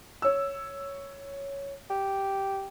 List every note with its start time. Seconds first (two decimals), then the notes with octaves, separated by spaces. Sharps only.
0.22 C#5 E6
1.90 G4